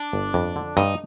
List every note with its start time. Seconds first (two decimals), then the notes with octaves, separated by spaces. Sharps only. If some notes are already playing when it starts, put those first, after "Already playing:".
Already playing: D4
0.13 G1
0.34 F2
0.56 D3
0.77 G2 D#4